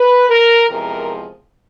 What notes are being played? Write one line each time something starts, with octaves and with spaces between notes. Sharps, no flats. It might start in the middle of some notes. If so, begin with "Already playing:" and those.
Already playing: B4
A#4
E2 C3 F3 G#3 A#4